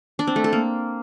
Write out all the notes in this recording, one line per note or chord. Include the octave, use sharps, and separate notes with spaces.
D4
C4
A3
A4
A#3